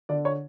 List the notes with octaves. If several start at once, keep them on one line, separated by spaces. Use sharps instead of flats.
D3 D5
C#5